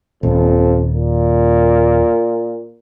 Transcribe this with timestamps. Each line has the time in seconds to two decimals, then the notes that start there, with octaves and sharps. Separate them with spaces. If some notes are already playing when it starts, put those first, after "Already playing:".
0.23 D#1 F2
0.94 A#2